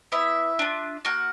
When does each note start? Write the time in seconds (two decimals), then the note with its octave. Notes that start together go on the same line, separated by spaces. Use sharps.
0.12 B3 E4 E5
0.59 D4 F4
1.05 A#3 F#4 F#5